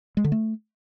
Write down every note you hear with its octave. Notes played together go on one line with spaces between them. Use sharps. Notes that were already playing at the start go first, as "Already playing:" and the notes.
G#3
D3
A3